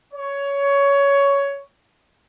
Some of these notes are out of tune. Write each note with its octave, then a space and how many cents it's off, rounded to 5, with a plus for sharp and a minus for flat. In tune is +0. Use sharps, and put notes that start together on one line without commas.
C#5 +15